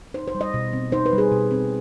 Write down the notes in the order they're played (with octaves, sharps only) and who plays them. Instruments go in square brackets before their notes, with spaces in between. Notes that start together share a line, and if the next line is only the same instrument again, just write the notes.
[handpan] D#4 C5
C5
G3
D#5
B2
C4
D#4 C5
B4
G3
G#4
B2
C4